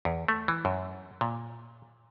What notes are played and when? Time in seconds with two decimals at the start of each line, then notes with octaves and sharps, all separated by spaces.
0.05 E2
0.28 A3
0.48 E3
0.65 F#2
1.21 A#2